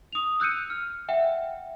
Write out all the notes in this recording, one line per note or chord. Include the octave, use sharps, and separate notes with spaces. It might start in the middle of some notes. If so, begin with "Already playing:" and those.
D#6 F7
E6 F#6 G6 C#7 D#7
F6
E5 F#5 G5